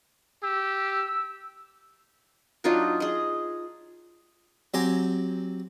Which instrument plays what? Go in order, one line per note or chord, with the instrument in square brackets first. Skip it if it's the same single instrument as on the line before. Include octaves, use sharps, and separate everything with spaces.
[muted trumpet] G4 [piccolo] E6
[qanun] F#3 D4 D#4 F4
G#4 D#5
[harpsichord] F#3 C4 G4 C5 G#5 A#5